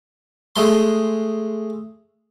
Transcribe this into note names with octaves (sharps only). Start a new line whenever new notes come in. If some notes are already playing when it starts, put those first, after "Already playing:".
G#3 A3 C6